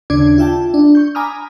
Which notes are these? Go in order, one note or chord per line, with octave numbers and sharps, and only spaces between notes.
D#2 C#3 D4 D6 G#6
F4 E5 G5 A5
D4
C#6 G6
G#5 A#5 B5 D6 D#6 F6